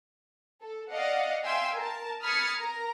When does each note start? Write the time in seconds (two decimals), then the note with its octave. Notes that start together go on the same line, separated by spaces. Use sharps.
0.61 A4
0.92 D5 D#5 F5 F#5
1.44 E5 F5 G5 G#5 C6 E6
1.76 A#4 A5
2.22 B5 D#6 F6 G#6 A6 C#7
2.58 A#4 A#5